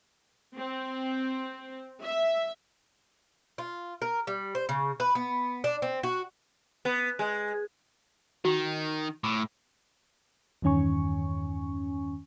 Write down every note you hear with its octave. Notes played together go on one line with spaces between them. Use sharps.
C4
E5
F4
A#4
G3
C5
C#3
B4
B3
D4
C4
F#4
B3
G#3
D#3 F#4
A2 D6
E2 G2 D#3 C#4 G#5 C#6